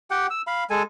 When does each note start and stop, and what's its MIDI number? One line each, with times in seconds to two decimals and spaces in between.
0.11 0.27 67
0.11 0.27 78
0.11 0.27 79
0.30 0.42 88
0.47 0.64 77
0.47 0.64 83
0.70 0.83 56
0.70 0.83 69
0.70 0.83 80